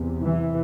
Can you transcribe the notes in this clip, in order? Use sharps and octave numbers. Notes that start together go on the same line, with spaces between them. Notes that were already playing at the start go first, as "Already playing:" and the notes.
Already playing: E2 C3
E3